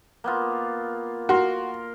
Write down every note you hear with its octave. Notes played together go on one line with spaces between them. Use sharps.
A#3 B3 F4
F#4 A#4 C6